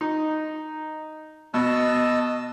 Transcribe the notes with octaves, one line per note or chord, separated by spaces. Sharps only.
D#4
B2 D#5 A5 E6